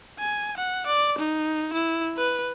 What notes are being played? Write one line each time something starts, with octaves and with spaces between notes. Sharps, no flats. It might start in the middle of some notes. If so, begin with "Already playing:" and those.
G#5
F#5
D5
D#4
E4
B4